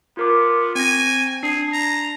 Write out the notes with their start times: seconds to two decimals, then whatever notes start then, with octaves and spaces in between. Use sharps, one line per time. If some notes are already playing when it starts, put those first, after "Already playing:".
0.17 B3 F4 A#4 D6
0.75 C4 G#5 A#6
1.43 D4 G#4 C7
1.73 A#5